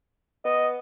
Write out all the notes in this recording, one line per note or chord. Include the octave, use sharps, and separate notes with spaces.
B3 D#5